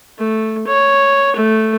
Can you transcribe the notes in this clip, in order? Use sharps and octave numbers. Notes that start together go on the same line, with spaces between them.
A3
C#5
A3